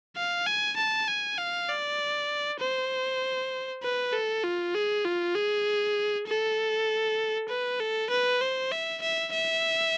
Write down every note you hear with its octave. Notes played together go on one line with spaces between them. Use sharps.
F5
G#5
A5
G#5
F5
D5
C5
B4
A4
F4
G#4
F4
G#4
A4
B4
A4
B4
C5
E5
E5
E5